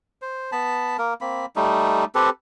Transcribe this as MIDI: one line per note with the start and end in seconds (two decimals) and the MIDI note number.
0.22 0.51 72
0.52 0.97 59
0.52 0.97 81
0.52 0.97 83
0.99 1.14 58
0.99 1.14 70
1.21 1.46 58
1.21 1.46 60
1.21 1.46 83
1.56 2.05 55
1.56 2.05 57
1.56 2.05 63
2.15 2.30 60
2.15 2.30 67
2.15 2.30 69
2.15 2.30 71